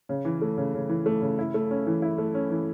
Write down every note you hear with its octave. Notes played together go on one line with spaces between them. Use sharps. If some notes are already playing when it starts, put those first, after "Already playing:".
C#3
E3
A3
C#3
C#3
E3
A3
C#3
E4
A3
C#4
E3
E4
A3
C#4
E3